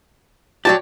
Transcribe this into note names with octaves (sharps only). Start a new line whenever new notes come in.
F#3 F#4 G4 C#5 D5 A5